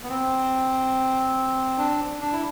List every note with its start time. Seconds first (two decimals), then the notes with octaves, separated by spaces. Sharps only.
0.03 B3
0.09 C4
1.78 D4
2.21 D4
2.33 E4